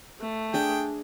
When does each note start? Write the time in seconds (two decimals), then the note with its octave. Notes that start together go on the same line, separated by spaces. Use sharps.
0.20 A3
0.54 D4 G#4 G5